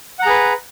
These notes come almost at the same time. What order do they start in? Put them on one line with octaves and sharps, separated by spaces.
F#5 A#5 G#4 B4